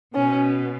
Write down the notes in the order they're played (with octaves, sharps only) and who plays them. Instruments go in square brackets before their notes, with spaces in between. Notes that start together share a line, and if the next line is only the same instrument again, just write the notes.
[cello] B2 [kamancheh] C#4